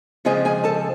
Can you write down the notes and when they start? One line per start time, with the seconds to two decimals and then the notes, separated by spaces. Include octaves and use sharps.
0.25 F2 C#3 F3 G#3 C4 G#4 G#5
0.45 G#4 G#5
0.64 A4 A5